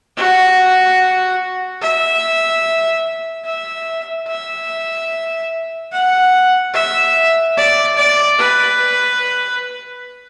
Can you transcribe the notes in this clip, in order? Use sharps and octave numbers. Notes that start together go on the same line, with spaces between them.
F#4
E5
E5
E5
F#5
E5
D5
D5
B4